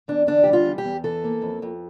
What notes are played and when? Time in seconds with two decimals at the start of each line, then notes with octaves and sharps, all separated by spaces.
0.08 E2 D4
0.27 D3 D4
0.44 G3 G4
0.53 F4
0.65 E2
0.78 G4
0.84 E2
1.04 E3 A4
1.24 A#3
1.42 F2
1.62 F2